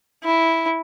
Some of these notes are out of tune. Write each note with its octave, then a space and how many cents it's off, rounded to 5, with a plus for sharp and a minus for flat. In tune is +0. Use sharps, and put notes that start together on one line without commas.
E4 -5